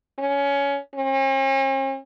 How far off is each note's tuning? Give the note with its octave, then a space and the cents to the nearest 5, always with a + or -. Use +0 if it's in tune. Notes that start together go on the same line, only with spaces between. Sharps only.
C#4 +20
C#4 -45